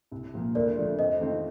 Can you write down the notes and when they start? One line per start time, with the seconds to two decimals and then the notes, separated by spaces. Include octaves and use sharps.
0.12 C2
0.34 A#2 F3 A#3
0.55 D2 A#4 D5
0.76 D3 F3 A3
0.99 F2 C5 D#5
1.20 D#3 A3 C4 F4